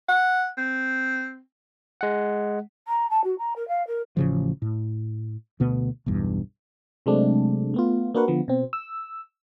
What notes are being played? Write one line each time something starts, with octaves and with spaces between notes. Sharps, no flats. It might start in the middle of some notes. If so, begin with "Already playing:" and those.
F#5
C4
G#3 F#5
A#5
A5
F#4
A#5
A#4
F5
A#4
A1 C#3 F3
A2
D2 B2 B3
B1 E2 G2
C3 F#3 G#3 A3 C4 D4
A3 B3 F4
A#3 D4 F#4 A#4 B4 F#5
D3 F3 B3
B2 C4
E6